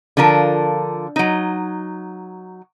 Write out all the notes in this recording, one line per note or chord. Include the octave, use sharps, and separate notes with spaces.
D3 F3 F4 A#4 A5
F#3 D#4